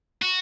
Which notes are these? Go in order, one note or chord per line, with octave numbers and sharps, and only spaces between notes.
F#4